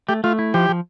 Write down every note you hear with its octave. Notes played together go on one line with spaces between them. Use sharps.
A3 G4
A3 F4
E4
F3 G4
F3